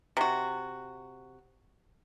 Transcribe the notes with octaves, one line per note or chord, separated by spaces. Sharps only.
C3 F#4